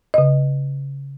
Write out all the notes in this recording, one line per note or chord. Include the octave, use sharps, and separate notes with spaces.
C#3 D#5